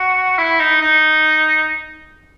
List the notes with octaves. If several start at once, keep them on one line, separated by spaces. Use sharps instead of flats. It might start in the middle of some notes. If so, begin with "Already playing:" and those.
Already playing: F#4
E4
D#4
D#4